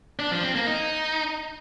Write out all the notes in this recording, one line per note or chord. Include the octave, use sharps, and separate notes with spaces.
D4
F3
C4
A#3
D#4